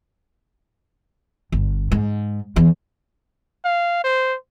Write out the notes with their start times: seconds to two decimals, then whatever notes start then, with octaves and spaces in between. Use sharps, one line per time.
1.52 G1
1.92 G#2
2.56 E2
3.65 F5
4.04 C5